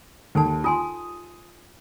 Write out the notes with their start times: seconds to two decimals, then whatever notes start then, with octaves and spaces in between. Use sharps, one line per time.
0.35 D#2 D#4 A4 A5
0.64 F4 G#5 C6 D#6